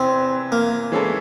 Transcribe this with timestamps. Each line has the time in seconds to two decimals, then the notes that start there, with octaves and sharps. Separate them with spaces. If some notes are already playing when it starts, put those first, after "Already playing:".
Already playing: E2 C3 E3 C4
0.52 A#3
0.92 E3 G#3 C#4 E4 A4